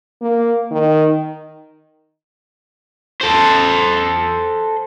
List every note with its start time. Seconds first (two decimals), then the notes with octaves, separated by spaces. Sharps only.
0.22 A#3
0.71 D#3
3.21 A4 C5